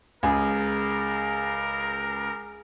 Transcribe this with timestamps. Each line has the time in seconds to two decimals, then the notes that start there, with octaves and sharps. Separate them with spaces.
0.23 C#2 G#4 A#4